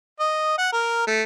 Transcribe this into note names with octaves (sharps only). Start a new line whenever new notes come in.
D#5
F#5
A#4
A3